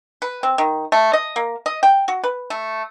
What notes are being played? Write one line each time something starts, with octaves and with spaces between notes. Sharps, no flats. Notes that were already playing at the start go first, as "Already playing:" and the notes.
B4
C4
D#3
A3
D#5
A#3
D#5
G5
F#4
B4
A3